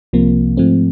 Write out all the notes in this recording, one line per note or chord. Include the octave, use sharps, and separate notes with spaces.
C2 C3 F3 A#3
G#2 F3 A3 C4